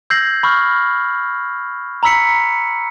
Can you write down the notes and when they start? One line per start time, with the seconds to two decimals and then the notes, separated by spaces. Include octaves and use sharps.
0.10 E6 G6 G#6 A#6 C7 F#7
0.43 B5 C#6 E6 F6
2.03 A#5 B5 E6 B6 C#7